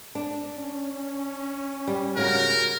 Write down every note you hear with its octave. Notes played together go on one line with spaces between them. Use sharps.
D4
C#4
G3
C#3 F#4 A#4